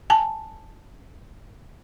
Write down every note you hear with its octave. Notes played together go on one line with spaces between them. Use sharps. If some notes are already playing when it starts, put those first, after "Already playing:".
G#5 A5